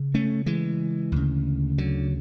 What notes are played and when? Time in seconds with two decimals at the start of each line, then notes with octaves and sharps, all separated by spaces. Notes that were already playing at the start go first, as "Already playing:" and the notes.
Already playing: C#3
0.14 A3 C#4
0.46 E3 G#3
1.12 D2 C#3
1.78 D3 F#3